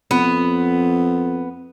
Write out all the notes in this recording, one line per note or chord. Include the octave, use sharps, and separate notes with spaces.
F2 B3